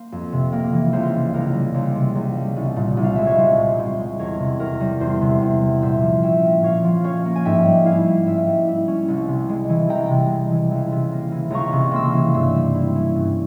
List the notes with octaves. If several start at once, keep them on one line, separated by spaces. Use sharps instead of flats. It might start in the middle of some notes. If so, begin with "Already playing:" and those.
Already playing: A#3 C5
F2
C3
A#3
E3
C#2 C5
C3
C#2 A#4
G3
C#2 C5
C3
C#2
G3
C2
A#2
C2
F5
G#3 E5
C#5
C2 C5
A#2
C2 C5
G#3
E2 A#4 C#5
C3
E2 A#4
G3
E2 C5
C3
E2
G3
A#2 C5 E5
F3
C#4 E5 G5
A#3
A#2 C#5 F5
F3
C#4 C#5 F5
A#3
G#5
G#2 E5 G5
G3
E4 F5 G#5
C#4
G#2 E5 G5
G3
E4
C#4
C2
C3
G#3
E3
C2 G5 A#5
C3
G#3
E3
C#2
C3
A#3
E3
C#2 A#5 C#6
C3
A#3 C6 E6
E3
G2 C6 E6
G3
E4
C#4
G2